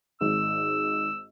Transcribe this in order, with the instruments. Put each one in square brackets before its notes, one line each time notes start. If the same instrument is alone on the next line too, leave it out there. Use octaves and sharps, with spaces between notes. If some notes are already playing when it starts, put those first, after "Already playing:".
[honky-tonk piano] G#1 G#2 [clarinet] E6